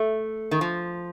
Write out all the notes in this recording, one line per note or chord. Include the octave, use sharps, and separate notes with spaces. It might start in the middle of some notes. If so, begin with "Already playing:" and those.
Already playing: A3
D#3
F3